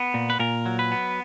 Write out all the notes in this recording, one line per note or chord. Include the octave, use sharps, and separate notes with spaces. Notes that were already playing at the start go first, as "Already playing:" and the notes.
Already playing: B3
A#2
B4
A#2 A#4
F#3
B4
B3